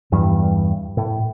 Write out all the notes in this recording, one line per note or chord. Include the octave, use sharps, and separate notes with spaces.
E2 G2 E3 G3
A2